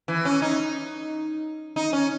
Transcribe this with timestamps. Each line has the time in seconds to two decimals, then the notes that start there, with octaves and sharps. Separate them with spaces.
0.08 E3
0.25 C#4
0.42 D#4
1.76 D#4
1.93 C#4